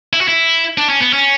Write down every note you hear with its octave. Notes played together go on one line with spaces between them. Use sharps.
E4
F#4
E4
D4
C#4
B3
C#4